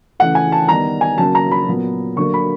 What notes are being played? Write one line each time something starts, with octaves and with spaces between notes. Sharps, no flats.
C#3 E3 A3 F#5
G#5
A5
D#3 G3 B3 A#5
G#5
C#3 F#3 A#3 A5
A#5
B5
A#2 F#3 B3
D3 F#3 A#3 C#6
B5